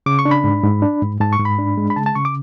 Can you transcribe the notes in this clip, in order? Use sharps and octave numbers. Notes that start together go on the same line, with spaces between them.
C#3 D6
C#6
D4
B5
G#2
G#2
D4
G#2
G#2 A5
C#6
G#2
B5
D4
G#3
B5
C#3 A5
A5
C#3 C#6
D6